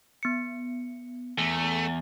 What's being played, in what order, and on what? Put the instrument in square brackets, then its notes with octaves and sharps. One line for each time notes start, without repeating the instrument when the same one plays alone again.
[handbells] B3 C#7
[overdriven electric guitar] E2 [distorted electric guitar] A3